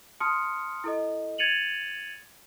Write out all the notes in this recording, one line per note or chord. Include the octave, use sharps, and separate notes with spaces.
A5 C6 D#6 F6 C#7
E4 A4 D#5
G#6 A6 C#7 D#7 F7 F#7